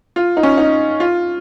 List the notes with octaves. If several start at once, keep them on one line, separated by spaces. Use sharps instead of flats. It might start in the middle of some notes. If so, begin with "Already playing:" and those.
F4
D#4
C#4
D#4
F4